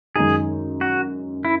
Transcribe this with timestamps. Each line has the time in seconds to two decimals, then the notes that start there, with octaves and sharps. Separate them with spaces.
0.16 F#2 D#3 G#3 D#4 G#4
0.81 F#4
1.45 E4